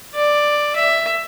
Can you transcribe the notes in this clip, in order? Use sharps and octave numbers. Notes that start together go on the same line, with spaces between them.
D5
E5